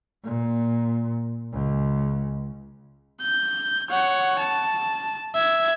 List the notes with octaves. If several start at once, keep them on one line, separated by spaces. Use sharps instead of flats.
A#2
C#2
G6
C#5 F#5
A5
E5 G#6